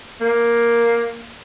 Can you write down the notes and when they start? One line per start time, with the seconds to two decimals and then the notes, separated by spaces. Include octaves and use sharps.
0.21 A#3